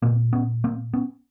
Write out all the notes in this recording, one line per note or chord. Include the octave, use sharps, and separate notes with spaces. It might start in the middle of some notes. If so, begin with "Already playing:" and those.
A#2 A#3 C4
B3 C#4
A#3 C4
B3 C#4